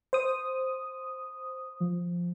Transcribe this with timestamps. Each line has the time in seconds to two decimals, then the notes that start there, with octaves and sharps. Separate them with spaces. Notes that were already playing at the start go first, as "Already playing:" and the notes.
0.13 C5 D#6
1.80 F3